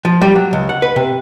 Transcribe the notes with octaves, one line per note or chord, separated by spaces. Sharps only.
F3
G3
F#3
C#2
F#5
B4
C3